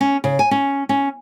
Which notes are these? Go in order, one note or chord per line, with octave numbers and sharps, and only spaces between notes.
C#4
C#3
G#5
C#4
C#4